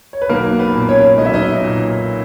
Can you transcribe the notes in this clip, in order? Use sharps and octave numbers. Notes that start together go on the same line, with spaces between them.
C#5
B4
B1 A#3 A#4
B3 B4
A#2
C#4 C#5
B1 D#5
E5
D#4 D#5
A#2